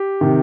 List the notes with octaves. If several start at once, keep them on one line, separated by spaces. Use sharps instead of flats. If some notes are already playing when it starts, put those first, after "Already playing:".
Already playing: G4
C3 D#3